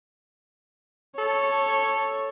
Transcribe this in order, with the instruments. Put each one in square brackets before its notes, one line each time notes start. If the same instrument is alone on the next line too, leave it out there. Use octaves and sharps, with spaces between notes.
[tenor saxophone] A4 [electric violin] C#5